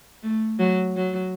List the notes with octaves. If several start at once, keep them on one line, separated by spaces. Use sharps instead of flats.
A3
F#3
F#3